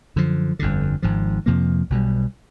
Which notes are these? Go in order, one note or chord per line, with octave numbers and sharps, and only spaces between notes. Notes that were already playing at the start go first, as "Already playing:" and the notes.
F#2 D3 F3
G1 F2 D3
G#1 G#2 F3
F2 C3 F3 A#3
B1 B2 G3